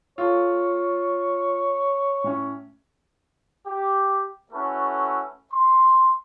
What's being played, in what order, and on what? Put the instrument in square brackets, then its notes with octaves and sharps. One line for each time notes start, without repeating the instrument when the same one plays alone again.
[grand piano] F4 A4 [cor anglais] C#5
[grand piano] A2 C#4
[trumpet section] G4
A3 C#4 E4 F#4 A4 B4
C6